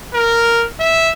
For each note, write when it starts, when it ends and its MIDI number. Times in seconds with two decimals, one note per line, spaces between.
0.14 0.65 70
0.80 1.12 76